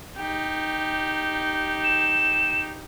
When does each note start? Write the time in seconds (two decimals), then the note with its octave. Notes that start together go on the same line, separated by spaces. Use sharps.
0.17 D#4 G4
1.84 E7